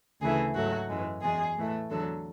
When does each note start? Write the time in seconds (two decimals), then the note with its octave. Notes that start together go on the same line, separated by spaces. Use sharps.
0.21 D2 C#3 E3 A3 G#4
0.55 G#2 F#3 A3 F#4
0.88 F#2 E3 G#3
1.22 E2 B2 G#3 G#4
1.57 A2 E3 A3
1.90 E2 D3 F#3 A4